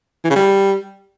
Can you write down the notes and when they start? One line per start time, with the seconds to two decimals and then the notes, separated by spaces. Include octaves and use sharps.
0.24 E3
0.30 C#3
0.36 G3